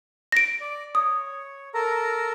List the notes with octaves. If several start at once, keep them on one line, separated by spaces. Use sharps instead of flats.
A#6 D7
D5
C#5 D#6
A4 A#4 A#5